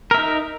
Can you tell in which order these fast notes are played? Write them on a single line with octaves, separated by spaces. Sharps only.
A#4 E5 D#4